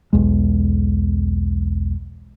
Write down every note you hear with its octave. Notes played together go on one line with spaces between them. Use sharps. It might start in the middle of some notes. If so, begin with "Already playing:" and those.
B1 E2 G#3